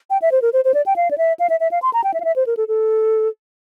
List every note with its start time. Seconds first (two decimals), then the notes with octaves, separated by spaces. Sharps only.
0.10 G5
0.22 E5
0.32 C5
0.42 A#4
0.53 C5
0.65 C5
0.74 D5
0.86 G5
0.96 F5
1.11 D5
1.18 E5
1.39 F5
1.50 E5
1.60 E5
1.71 F5
1.82 C6
1.93 A#5
2.04 G5
2.14 E5
2.20 F5
2.24 E5
2.36 C5
2.47 A#4
2.57 A4
2.68 A4